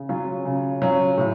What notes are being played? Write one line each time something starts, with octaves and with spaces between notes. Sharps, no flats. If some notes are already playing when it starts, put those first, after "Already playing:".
Already playing: C#3
F#3 C#4 F4
C#3
F#3 C#4 F4
A2